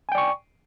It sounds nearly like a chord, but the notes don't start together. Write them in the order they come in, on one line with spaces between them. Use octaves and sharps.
G#5 G5 D5 C#6